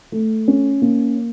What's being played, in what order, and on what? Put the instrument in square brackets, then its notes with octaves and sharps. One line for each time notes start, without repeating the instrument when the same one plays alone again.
[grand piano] A3
C#4
A#3